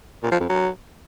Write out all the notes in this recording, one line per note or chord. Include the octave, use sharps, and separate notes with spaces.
A#2
F3
F2
F#3